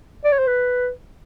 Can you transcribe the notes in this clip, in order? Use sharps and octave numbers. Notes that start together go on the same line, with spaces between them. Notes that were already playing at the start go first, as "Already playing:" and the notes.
D5
C#5
C5
B4